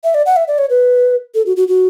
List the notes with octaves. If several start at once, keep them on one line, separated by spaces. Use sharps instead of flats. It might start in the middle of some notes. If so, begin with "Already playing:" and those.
E5
D5
F#5
E5
D5
C#5
B4
A4
F#4
F#4
F#4